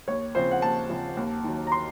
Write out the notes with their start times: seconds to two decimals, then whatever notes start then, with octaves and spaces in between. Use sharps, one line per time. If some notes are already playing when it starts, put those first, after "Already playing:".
0.08 D#2 C#5
0.35 C#3 F3 C4 C5
0.51 F#5
0.62 D#2 A5
0.89 C#3 F3 C4
1.17 D#2
1.44 D#3 F#3
1.67 A#5
1.72 C6